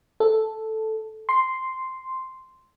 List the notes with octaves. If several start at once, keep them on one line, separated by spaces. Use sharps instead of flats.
A4
C6